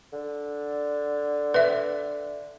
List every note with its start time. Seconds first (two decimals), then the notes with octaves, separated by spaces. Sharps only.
0.13 D3
1.54 B4 E5